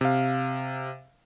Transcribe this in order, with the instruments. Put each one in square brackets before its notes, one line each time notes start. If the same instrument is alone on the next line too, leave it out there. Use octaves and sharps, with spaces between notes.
[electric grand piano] C3 F5